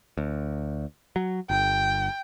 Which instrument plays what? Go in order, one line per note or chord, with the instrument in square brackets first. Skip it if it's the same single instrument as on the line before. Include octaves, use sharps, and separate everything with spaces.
[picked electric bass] D2
F#3
[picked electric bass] G1 [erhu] G5